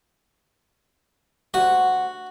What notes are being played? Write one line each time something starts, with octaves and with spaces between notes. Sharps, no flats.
D2 F#4 F#5